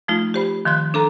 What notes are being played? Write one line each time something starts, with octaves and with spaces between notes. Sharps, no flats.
F3 A3 D#4 F4
G4 C5 B5
D#3 F3 C6 F#6
D4 A4 A#5